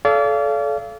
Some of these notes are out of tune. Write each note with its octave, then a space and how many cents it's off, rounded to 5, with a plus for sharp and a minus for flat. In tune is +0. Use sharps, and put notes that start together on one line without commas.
A4 -25 D5 -35 F5 -25